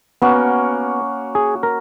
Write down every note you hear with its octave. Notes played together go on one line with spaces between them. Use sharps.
A#3 B3 C#4 F#4
G#4
A#4